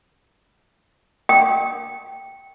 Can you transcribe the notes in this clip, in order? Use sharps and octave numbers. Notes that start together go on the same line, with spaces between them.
G5